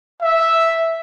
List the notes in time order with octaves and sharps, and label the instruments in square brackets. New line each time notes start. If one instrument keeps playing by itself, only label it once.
[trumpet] E5